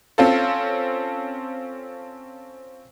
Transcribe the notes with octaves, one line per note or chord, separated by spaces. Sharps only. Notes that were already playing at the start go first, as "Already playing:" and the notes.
C4 C#4 F4 A4